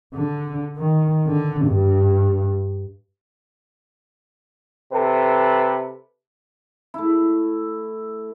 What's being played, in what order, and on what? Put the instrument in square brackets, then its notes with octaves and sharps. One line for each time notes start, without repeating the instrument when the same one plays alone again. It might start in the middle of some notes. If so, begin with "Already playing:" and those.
[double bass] D3
D#3
D3
G2
[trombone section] C3 A4 B4
[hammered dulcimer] A3 E4